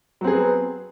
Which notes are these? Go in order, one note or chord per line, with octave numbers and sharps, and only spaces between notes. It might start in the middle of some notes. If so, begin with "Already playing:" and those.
F#3 B3 C4 G#4 B4